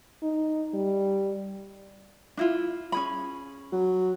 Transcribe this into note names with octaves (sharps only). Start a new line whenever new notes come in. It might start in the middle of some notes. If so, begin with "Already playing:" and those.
D#4
G3
D4 E4 F4
C#4 G#4 B5
F#3